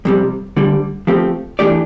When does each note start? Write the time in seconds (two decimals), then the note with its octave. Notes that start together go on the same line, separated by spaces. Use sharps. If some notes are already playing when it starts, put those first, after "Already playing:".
0.05 F2 C3 G3
0.57 D2 D3 G3
1.07 F3 A3 C4 G4
1.59 E3 A3 D4 G4 D5